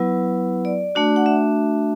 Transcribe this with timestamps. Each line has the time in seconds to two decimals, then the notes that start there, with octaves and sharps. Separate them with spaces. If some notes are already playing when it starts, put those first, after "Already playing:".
Already playing: F#3 B3 E4 B4
0.65 D5
0.95 A3 D4 F#4
1.16 F#5
1.26 E5